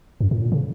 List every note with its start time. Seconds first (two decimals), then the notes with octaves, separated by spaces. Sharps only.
0.21 F#2
0.31 A2
0.41 A#2
0.52 C#3